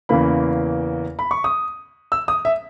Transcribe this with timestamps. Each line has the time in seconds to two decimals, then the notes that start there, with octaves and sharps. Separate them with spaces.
0.09 E2 C#3 E3 A#3 B5
1.19 B5
1.31 C#6
1.44 D#6
2.12 E6
2.28 D#6
2.45 E5